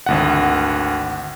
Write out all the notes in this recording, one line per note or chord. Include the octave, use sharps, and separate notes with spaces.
G#1 D2 F#5